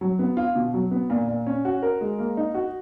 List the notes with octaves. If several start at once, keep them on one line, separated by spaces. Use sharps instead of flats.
F#3
B3
F4
B2
F#3
B3
A#2
A#2
C#4
F#4
A#4
G#3
A#3
D#4
F#4